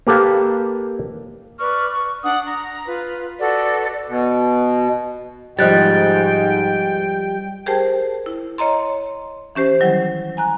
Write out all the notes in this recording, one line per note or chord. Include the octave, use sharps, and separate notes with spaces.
A#3 G4 A4 B4 F5
B4 D5 C#6 F6
C#6
D4 F#5 D#6
A#5
F4 B4
F#4 A4 B4 D5
B2
G#2 F3 G3 D#5 G5 F#6 A6
G4 G#4 A#4 C5 G5 A5
E4
C#5 D#5 A#5 C6
E3 C#4 G4 C5
D#3 F#3 G3 E4
G#5 A#5 F#6